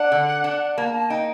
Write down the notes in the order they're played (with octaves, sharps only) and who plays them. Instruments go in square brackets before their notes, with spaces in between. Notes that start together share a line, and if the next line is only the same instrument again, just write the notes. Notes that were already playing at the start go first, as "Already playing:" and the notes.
Already playing: [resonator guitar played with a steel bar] D4 [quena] F#5
[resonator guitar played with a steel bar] D3
D4
[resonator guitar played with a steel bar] A#3 [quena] A5
[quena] A5
[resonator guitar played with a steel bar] D#4 [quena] G5